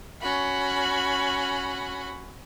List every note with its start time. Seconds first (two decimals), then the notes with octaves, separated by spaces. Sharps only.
0.21 C#4 F#4 B5